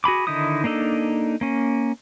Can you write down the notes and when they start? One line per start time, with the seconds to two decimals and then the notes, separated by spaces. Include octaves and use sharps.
0.04 F#4 G#4 B5 D6
0.27 D3 D#3 D#4 E4 D#6
0.64 A#3 D4 D#4 A4
1.41 A#3 C#4